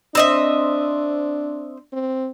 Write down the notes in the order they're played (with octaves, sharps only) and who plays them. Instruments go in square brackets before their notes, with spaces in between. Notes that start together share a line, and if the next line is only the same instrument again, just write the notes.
[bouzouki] C4 D#5 E5 [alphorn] D4
[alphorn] C4